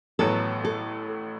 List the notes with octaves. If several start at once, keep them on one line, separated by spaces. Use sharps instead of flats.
A1 A2 F#3 B3 A4
A4